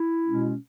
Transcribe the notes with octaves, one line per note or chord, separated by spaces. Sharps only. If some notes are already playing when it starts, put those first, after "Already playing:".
Already playing: E4
B2 G#3 C#4